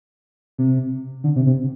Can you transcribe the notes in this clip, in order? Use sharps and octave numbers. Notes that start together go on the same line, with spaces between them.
C3
D3
C3
C3